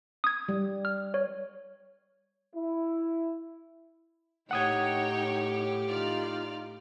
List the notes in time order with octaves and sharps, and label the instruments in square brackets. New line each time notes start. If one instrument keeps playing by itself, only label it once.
[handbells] D#6 G#6
[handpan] G3
[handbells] F6
C#5
[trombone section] E4
[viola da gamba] A2 G4 [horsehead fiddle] D#4 [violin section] C#5 G5 [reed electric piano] F#5 D#6 G#6
[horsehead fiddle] D#4 F4 [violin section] D5 F6